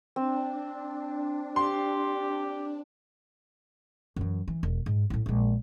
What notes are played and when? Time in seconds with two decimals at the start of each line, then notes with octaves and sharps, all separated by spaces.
0.16 C4 D4
1.56 G4 C6
4.16 F#2 E3
4.48 E3
4.63 E1
4.86 G#2
5.10 A2 E4
5.26 A#1 G#3